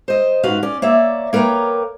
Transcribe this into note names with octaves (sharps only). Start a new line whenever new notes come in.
C5 D#5
G#2 C#4 F#4 B4 F5
C#4 D5
A#3 C#5 D5 E5
A#3 A#4 B4 C#5 G5